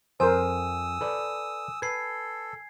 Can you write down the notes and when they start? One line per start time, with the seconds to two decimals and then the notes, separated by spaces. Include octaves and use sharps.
0.20 F2 A#4 C5 G#5 D#6 E6
1.01 A4 B4 D5
1.82 A4 B4 G#6 C7